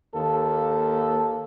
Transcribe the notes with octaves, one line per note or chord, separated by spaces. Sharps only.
D#2 A#3 A4